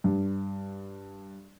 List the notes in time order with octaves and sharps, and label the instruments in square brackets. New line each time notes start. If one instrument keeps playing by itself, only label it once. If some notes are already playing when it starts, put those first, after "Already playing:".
[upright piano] G2